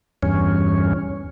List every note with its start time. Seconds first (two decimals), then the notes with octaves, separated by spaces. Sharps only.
0.23 E2 G2 C#4